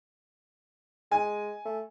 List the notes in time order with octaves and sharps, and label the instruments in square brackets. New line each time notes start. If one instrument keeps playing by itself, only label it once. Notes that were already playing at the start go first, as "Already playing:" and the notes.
[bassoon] G#3 [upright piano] G#5
[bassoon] A3